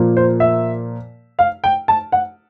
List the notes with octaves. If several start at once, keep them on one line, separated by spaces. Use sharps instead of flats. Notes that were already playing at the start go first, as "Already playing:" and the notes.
Already playing: A#2 F3 A#3
C5
E5
F5
G5
A5
F#5